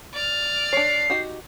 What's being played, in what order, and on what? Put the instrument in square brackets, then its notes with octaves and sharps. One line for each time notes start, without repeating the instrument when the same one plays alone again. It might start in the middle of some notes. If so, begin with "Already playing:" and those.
[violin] D5 F6
[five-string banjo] D4 C#5 [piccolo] C7
[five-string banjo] D#4 F#4 G4